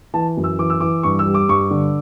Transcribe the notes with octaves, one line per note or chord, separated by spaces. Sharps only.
E3 A5
F#2
E6
E3 D6
E6
E3 D6
G2 C#6
E6
G3
D6
G2 C#6
D3